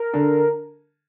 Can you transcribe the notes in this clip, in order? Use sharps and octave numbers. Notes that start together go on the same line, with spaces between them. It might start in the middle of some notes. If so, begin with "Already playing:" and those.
Already playing: A#4
D3